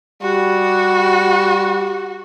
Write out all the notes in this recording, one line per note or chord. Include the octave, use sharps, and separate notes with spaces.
G3 F#4